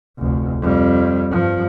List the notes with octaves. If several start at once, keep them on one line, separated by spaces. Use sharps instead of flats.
F1 D2
F2 G3
G2 F3